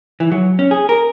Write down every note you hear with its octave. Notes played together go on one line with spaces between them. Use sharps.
E3
F#3
C#4
G#4
A#4